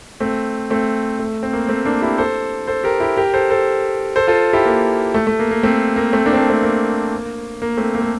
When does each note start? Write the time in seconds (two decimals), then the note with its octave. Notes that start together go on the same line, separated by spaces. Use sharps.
0.20 A3 C4
0.70 A3 C4
1.19 A3
1.43 C4
1.53 A#3
1.69 A3 C4
1.85 A#3 D4
2.02 E4 G4
2.18 A4 C5
2.67 A4 C5
2.84 G4 A#4
3.00 E4 G4
3.17 G4 A#4
3.34 A4 C5
3.50 A4 C5
4.16 A4 C5
4.27 F4 A4
4.53 E4 G4
4.65 A#3
5.14 A3
5.27 A3
5.39 A#3
5.51 A#3
5.63 A3 C4
5.96 A#3
6.13 A3 C4
6.25 A#3 D4
6.33 C4
6.37 A#3 D4
6.50 A3 C4
6.63 A#3
7.62 A#3
7.77 A3 C4
7.95 A#3
8.02 A3